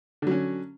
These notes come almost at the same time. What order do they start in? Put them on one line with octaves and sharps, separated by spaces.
D3 F#3 C#4